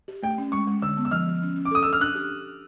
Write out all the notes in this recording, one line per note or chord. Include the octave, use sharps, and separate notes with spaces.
G4
A3 G5
C#4
G#3 C#6
G#3
D3 E6
B3
E6
F3 F6
F3
C#4
C#4
D6
A4 D#6
E6
A4
F6
D4 F#6
G4